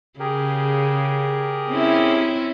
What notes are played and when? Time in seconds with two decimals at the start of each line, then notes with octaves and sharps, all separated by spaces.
0.20 C#3 G4 G#4 A#4
1.69 C4 C#4 E4
2.19 E5